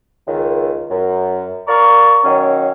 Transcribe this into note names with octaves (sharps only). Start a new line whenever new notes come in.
C#2 D#3
F#2
A#4 D5 F5 A#5 C#6
D#3 F#3 A#3 C#4